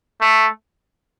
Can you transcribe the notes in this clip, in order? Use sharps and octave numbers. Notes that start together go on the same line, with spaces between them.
A3